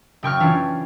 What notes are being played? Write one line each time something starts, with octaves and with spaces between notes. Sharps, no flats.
F#1 G5 C#6 F6
E3 C#4 D4 F4